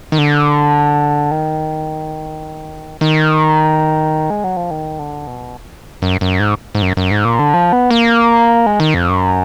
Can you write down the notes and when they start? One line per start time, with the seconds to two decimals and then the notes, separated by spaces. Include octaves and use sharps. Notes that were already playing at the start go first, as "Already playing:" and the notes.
0.12 D#3
0.18 D3
1.31 D#3
3.01 D#3
4.30 G#3
4.44 F#3
4.57 F3
4.71 D#3
4.99 D3
5.27 B2
6.02 F#2
6.21 F#2
6.40 G#2
6.75 G#2
6.82 F#2
6.97 F#2
7.11 G#2
7.25 A#2
7.39 D3
7.54 F3
7.73 B3
7.91 A#3
8.66 G#3
8.80 D#3
8.94 F2
9.09 F#2